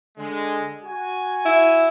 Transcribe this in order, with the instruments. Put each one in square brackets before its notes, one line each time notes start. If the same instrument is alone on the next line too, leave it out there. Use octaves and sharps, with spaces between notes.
[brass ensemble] D3 G#3
F#4 G#5
[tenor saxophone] E4